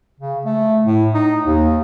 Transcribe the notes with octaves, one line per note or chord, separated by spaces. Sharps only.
C#3
A3
A2
D#4
D#2